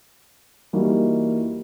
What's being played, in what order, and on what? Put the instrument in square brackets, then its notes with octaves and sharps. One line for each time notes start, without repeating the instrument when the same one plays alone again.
[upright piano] E3 G3 A#3 D#4 F#4